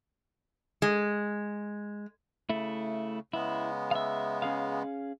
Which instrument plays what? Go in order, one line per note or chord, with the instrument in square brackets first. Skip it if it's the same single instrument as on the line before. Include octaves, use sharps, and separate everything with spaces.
[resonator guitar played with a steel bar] G#3
[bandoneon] C#3 [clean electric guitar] A3 E4
[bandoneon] C#3 G#3 B3 [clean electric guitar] E4
[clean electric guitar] E5 F5
C#4 G#4 F5